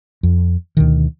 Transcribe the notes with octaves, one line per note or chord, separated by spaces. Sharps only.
F2
D2 B2 D#3